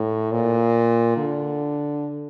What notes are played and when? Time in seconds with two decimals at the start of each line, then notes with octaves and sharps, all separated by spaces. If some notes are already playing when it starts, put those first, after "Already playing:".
Already playing: A2
0.32 A#2
1.17 D3